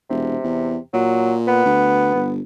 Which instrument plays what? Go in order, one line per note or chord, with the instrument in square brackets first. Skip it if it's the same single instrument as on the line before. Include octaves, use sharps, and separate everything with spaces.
[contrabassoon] E1 [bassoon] C3
[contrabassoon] E2
[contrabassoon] A#2 [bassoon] F#3
[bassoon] B3
[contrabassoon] D2
G1